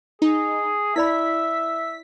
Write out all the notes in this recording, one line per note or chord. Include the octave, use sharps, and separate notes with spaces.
D#4 G#4
E4 D5 E5 B5 B6